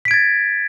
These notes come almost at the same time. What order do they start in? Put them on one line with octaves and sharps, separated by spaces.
B6 D7 G#6 A6